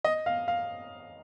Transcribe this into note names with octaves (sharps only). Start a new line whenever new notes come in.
D#5
F5
F5